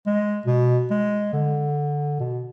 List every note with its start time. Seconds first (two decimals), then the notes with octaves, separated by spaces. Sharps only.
0.07 G#3
0.46 B2
0.90 G#3
1.33 D3
2.20 B2